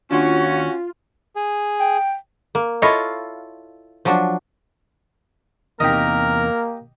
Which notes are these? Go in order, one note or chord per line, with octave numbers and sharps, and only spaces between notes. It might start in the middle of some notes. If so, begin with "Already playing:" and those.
D#2 C#4 D4 F4 F#4
G#4
G5
A#3
E4 F4 A4 C#5 D#5 F5
F3 F#3 D4
E2 C3 A#3 D#4 G4 A#4 D#5